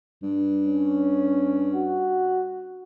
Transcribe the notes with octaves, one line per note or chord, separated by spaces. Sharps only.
G2
C#4
F#4